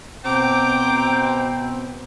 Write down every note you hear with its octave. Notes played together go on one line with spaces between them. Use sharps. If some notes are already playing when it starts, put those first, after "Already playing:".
B2 C4 G5 A#5 D6